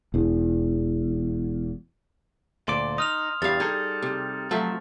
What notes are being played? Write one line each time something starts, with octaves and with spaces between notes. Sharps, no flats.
E1 E2
D2 A#2 D5 C6
D#4 D#6 F6 F7
E2 G2 G3 F5 A6
G3 D#4 G#4 A4
C3
F3 F#3 A3 E5